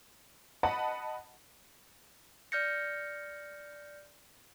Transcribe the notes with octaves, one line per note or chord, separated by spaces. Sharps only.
D#5 F#5 A5 B5
D5 F6 G6 A#6 C#7